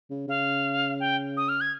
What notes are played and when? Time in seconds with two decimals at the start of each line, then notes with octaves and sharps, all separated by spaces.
0.10 C#3
0.28 C#3 F5
1.00 G5
1.37 D#6
1.49 F6
1.61 G#6